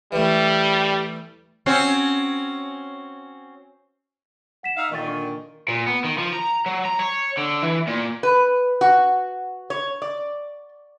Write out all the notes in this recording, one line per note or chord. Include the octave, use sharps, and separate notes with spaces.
E3 G3 A3
C4 C#4 F#4
F#5 B6 E7
D#4 E5 F5
A#2 D3 D#3 D#5 C#6 A6
D4 C#6
A#2
B3
D#3
F3
A#5
F#3
A#5
C#5
D3
E3
A#2
B4
F#4
C#5
D5